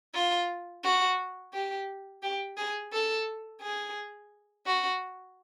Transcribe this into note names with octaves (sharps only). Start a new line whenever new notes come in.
F4
F#4
G4
G4
G#4
A4
G#4
F#4